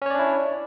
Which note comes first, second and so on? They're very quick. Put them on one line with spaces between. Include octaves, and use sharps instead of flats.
C#4 C#5 D5 D4 E4